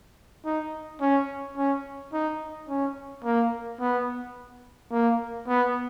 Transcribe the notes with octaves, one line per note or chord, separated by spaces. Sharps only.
D#4
C#4
C#4
D#4
C#4
A#3
B3
A#3
B3